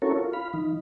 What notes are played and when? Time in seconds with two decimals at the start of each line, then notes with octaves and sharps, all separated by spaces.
0.02 C#4 E4 F#4 A4 A#4 C#5
0.16 F4
0.33 F5 B5
0.53 E3 D#4